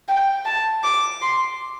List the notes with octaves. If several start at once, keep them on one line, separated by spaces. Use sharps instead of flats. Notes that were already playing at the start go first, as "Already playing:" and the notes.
G5
A5
D6
C6